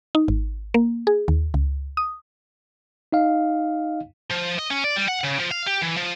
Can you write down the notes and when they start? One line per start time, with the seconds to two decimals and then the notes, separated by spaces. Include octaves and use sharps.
0.15 D#4
0.28 G#1
0.74 A#3
1.07 G#4
1.28 D#2
1.54 C#2
1.97 D#6
3.12 D#4 D#5 F5
4.30 F3
4.58 D#5
4.70 C#4
4.84 D5
4.96 G3
5.08 F#5
5.24 C#3
5.40 F3
5.51 F5
5.67 G4
5.82 E3
5.97 F3